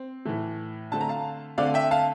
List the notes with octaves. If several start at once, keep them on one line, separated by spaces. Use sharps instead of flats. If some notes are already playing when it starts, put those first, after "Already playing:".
Already playing: C4
A2 E3 A3
D3 A3 C4 A5
A#5
F5 A5
D3 A3 C4 D5 F5
E5 G5
F5 A5